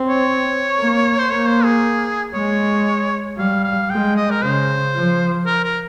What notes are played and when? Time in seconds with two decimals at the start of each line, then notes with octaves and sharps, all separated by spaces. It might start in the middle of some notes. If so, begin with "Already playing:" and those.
Already playing: C4
0.08 C#5
0.78 A#3
1.19 C5
1.30 A#3 C#5
1.47 C5
1.64 G#4
2.34 G#3 C#5
3.38 G3 F5
3.64 F5
3.90 G#3 G5
4.16 D#5
4.31 A#4
4.42 C#3 C5
4.95 F3
5.46 A#4
5.64 A#4